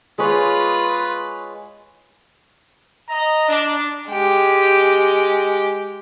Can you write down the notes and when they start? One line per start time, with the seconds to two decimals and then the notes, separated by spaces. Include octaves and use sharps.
0.18 G#3 F4 B4 C#5
3.09 D#5 A#5
3.49 D4
4.10 G#3 G4